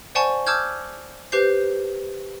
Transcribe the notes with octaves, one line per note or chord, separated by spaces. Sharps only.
C5 D5 F#5 G#5 A5 C#6
A5 D6 E6 F6 G6 G#6
G4 B4 C5 G6 C7